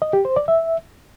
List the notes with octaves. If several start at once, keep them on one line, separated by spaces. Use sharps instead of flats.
D#5
G4
C5
D5
E5